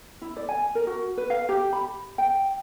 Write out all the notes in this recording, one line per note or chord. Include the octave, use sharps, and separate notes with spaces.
E4
D5
G#5
A#4
F#4
B4
F5
G4
B5
G5